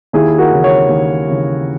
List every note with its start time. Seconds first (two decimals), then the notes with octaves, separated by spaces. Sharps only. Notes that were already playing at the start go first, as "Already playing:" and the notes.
0.13 D#2 E4 G#4
0.38 F#4 A#4
0.52 C#3 E3
0.64 A#4 C#5
0.89 D#2
1.26 C#3 E3